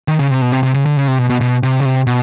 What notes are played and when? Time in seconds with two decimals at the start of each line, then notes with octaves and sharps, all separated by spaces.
0.08 D#3
0.19 C#3
0.30 C3
0.42 B2
0.52 C3
0.63 C3
0.74 C#3
0.86 D3
0.97 C#3
1.08 C3
1.19 B2
1.30 B2
1.41 B2
1.63 C3
1.80 C#3
1.85 C3
2.07 B2